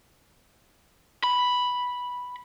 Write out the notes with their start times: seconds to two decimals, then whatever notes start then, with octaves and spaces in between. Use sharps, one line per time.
1.24 B5